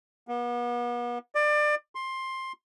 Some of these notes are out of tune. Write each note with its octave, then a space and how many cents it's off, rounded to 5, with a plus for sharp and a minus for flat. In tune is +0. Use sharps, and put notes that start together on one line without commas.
B3 -40
D5 +25
C6 +15